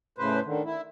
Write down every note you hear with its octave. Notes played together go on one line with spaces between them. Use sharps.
A2 C#3 B4 C5
D3 D#3
E4